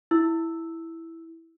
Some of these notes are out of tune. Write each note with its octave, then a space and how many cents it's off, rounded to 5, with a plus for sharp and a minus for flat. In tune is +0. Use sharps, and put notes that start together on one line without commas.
E4 +0 E6 +0